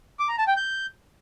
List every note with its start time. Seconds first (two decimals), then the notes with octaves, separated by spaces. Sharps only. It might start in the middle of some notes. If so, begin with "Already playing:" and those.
0.19 D6
0.29 A#5
0.38 A5
0.47 G5
0.57 G6